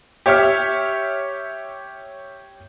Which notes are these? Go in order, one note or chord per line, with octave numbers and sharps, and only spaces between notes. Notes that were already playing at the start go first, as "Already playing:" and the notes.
G4 C#5 E5 C#6 F6